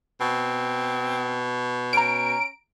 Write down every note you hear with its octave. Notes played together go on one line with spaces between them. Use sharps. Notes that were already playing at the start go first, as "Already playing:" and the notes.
B2 C4
C#4 A#5 D7